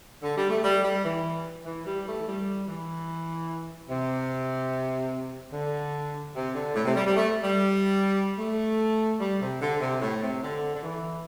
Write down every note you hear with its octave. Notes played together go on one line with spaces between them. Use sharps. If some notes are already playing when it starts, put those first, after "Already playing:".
D3
G3
A3
G3
G3
E3
E3
G3
A3
E3
G3
E3
C3
D3
C3
D3
A2
C3
G3
G3
A3
G3
A3
G3
C3
D3
C3
A2
C3
D3
D3
E3